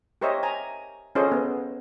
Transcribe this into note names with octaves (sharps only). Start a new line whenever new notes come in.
G4 A#4 C5 C#5 D#5 E5
G#5 A#5
C#4 F4 G#4 A4 C5 D#5
B3